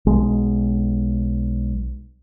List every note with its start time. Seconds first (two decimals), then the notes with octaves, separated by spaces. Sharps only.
0.06 B1 G#3